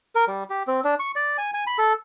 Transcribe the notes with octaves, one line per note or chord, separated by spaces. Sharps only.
A#4
G3
G4
C4
D4
C#6
D5
G#5
G#5
B5
A4